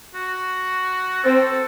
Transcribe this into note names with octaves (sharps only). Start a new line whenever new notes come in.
F#4
C4 A4